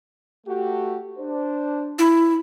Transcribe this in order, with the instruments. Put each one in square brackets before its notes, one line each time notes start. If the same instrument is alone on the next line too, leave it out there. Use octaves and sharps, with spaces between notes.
[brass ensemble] A3 F#4 G4
D4 C5
[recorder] E4